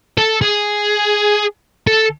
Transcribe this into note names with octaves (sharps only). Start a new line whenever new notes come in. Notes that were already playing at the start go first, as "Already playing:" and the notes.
A4
G#4
A4